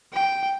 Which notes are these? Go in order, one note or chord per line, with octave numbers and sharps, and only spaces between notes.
G5